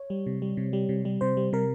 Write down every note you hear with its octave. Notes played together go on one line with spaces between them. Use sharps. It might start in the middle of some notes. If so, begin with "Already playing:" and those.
Already playing: C#5
G3
C3
G3
C3
G3
C3
G3
C3 C5
G3
C3 A#4